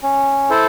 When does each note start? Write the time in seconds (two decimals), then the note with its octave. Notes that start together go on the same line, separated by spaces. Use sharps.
0.03 C#4
0.50 E4 A4 C5